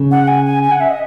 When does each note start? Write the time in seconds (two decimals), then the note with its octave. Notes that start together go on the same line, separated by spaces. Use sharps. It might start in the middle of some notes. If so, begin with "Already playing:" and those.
Already playing: C#3
0.11 F#5
0.27 G#5
0.46 G#5
0.63 G#5
0.71 F#5
0.80 E5
0.89 D#5